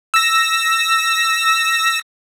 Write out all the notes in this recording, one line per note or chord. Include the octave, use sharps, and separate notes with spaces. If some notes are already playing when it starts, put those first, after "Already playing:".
E6 A#6